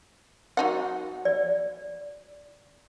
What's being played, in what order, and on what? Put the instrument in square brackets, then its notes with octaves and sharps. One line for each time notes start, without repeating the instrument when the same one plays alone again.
[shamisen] F#3 D#4 F#5
[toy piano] D5